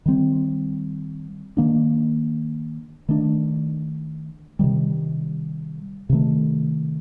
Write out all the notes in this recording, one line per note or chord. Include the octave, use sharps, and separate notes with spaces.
D#3 G3 C4
D#3 A#3 D4
D#3 A3 D4
C3 D#3 G3
C3 D#3 A3